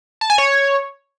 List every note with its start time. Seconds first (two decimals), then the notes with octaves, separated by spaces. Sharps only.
0.21 A5
0.30 G#5
0.38 C#5